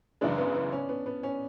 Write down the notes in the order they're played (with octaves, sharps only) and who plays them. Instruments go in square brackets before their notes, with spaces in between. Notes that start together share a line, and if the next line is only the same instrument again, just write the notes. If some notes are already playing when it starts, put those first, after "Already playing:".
[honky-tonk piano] F#2 C#3 E3 G#3 [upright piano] D4
[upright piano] B3
B3
C#4
B3
B3
C#4